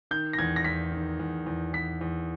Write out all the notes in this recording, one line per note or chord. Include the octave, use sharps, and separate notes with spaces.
D#3 G6
A#6
E2 G#6
A#6
E2 B6
D#3
E2
E2
E2 B6
E2